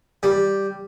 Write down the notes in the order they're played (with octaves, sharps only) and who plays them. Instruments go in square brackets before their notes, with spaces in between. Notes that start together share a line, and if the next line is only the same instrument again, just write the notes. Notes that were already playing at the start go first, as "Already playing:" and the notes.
[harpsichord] G3